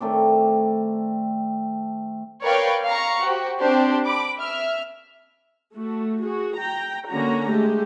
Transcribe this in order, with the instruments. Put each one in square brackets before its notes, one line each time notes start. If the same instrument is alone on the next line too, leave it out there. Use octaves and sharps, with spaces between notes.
[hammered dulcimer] D#3 A3 C4 D5
[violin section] A#4 B4 C#5 D5 F5 G5
F5 A#5 C#6
F#4 G4 C5
C4 D4 G4 C5
B5 D6
E5 F6
[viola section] A3 F#4
F#4 G#4
G5 A#5
D3 A#3 C#4 F#4 A#5
G#3 A3 G4